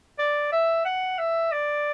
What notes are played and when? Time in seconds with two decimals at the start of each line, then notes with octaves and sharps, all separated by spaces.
0.19 D5
0.52 E5
0.85 F#5
1.18 E5
1.52 D5